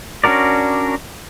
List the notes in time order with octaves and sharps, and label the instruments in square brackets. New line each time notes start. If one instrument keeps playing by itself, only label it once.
[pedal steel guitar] C#4 D4 F#4 A#4 D5